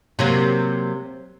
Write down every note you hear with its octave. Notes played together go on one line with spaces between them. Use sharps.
C3 F#3 A#3